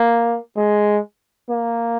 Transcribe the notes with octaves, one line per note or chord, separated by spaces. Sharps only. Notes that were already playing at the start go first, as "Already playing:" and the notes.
Already playing: A#3
G#3
A#3